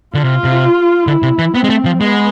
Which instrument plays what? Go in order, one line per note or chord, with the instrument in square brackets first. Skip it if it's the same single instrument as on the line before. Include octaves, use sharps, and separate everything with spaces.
[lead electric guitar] D3 [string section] F4
[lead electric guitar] C3
C3
[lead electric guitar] D3 [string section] E4
[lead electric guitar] C3
E3
[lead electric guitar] B3 [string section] C4
[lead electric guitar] G#3
A3
F3
[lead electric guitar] G#3 [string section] B3